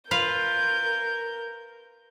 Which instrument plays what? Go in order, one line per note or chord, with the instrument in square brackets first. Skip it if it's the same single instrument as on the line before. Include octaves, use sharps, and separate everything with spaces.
[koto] F4 B4 F5 [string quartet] A#4 G6